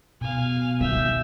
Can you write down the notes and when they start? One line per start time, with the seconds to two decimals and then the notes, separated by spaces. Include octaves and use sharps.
0.21 B2 F5 G#5
0.81 D#3 E5 G6